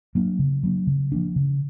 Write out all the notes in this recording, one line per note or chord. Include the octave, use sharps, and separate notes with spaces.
F#3 A#3 D4
C#3
F#3 A#3 D4
C#3
F3 A#3 D4
C#3